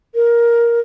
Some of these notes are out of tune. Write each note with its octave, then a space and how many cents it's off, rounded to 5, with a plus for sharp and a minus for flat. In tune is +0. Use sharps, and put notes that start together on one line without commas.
A#4 +10